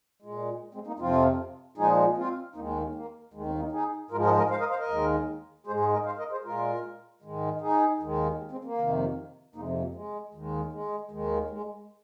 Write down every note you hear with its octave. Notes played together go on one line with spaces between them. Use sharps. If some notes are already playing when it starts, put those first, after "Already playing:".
A#2 G#3
G#3 C4
A#3 D#4
F2 C3 F3 C4 F4
A#2 F3 G#3 D#4 G#4
C4 F4
D#2 D#3 G#3 A#3 D#4
A#3
G#3
A#3
D#2 D#3 G#3
G#3 C4
A#3 D#4
D#4 G#4
G#2 F3 G#3 F4 A#4
A#4 D#5
A#4 D#5
C5 F5
A#4 D#5
C5 F5
A#4 D#5
D#2 D#3 G#3
G#2 G#3 G#4 C5
G#4 C5
A#4 D#5
C5 F5
A#4 D#5
G#4 C5
A#2 G#3 F4 A#4
G#2 D#3 G#3
D#4 G#4
D#2 D#3 G#3
G#3 C4
A#3
F2 C3 D#3
F2 C3 G#3 A#3 D#4
G#3 C4
A#3
G#3
D#2 D#3 G#3
G#3
D#2 D#3 G#3
G#3